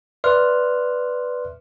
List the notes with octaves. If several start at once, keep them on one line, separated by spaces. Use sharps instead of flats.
B4 D5 E5 C6 F6 F#6